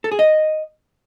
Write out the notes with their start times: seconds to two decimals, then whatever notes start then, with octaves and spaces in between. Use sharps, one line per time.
0.04 A4
0.12 G#4
0.19 D#5